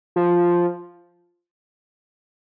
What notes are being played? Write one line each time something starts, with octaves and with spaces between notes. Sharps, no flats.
F3